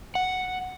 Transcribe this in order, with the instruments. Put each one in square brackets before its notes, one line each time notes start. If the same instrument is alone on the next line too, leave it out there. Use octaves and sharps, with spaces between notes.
[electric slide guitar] F#5